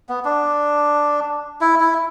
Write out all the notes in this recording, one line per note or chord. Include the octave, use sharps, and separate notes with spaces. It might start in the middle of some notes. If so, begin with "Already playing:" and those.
B3
D4
E4
E4